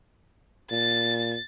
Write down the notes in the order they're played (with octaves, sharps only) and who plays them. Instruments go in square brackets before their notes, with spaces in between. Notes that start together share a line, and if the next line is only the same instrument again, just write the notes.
[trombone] A#2 [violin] A6